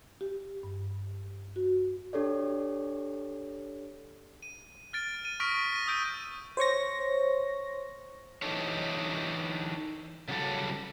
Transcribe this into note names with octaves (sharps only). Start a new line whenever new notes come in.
G4
G2
F#4
D4 G4 A4 C#5 D5
D#7
F6 A6 D7
D#7
C#6 D#6 F6 A#6 B6 D7
A#6 D#7
D#6 E6 G6 D7 D#7
C5 C#5 C#6 A#6
E3 D4 D#4 A4 C#5
C#3 F#3 G3 A4